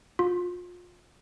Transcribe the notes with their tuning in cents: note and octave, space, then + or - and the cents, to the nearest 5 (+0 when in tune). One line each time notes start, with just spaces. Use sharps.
F4 +30